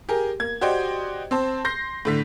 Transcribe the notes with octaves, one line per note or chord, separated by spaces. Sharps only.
G4 G#4 A#4
A#3 G#6
F#4 G4 C5 D5 D#5 G5
C4 C5 A5
C6 G6 A#6 C7
A2 D3 B6